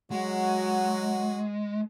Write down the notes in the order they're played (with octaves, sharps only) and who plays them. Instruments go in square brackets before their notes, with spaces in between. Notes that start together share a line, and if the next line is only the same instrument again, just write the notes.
[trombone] F#3 [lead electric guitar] G#3 [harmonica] F#4